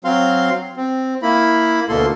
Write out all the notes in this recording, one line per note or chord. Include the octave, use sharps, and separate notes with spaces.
F#3 C4 F5 C6
C4
A#3 E4 B5
D2 B2 A#3 A4 C6